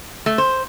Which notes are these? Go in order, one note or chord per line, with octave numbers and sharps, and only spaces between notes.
A3
C5